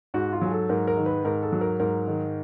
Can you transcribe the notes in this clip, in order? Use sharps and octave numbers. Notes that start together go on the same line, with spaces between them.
G#2 F#4
F4
F#3 G#4
A4
G#2 A#4
A#4
D#3
B4
G#2 A#4
A4
F#3
A#4
G#2 A#4
D#3